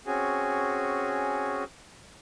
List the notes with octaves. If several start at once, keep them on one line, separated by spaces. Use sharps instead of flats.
C4 C#4 F#4 G#4